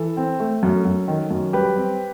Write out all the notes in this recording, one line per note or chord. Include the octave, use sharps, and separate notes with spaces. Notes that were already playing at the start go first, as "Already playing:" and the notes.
Already playing: E3 A4
C4
A3
F#2
F#2
D#3
F#2
G3 G4 B4
C4